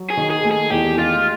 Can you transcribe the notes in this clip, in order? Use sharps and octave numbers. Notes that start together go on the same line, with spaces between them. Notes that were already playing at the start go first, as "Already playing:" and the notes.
Already playing: F#3
G#4
D#3
G#4
A3
G#4
E2 G4
G#3 F4